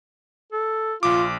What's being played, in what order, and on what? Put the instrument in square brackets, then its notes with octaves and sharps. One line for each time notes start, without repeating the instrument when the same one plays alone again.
[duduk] A4
[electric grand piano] A#1 D6 [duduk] F4